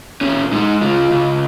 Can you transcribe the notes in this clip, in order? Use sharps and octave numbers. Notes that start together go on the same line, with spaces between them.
A#2 C#4
G#3 D#4
C#3 F4
C#3